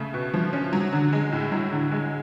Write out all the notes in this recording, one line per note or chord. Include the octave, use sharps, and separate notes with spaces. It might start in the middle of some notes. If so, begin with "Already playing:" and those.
Already playing: C#3 A3
B2
F3
C#4
F#3
D3
G#3
A2
F#3
D3
G#3